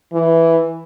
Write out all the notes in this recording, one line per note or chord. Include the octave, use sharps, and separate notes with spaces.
E3